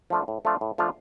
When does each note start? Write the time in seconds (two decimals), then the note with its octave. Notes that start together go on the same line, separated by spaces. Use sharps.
0.10 F3 A3 D4 F4
0.28 A2
0.45 F3 A3 D4 F4
0.61 A2
0.78 F3 A3 D4 F4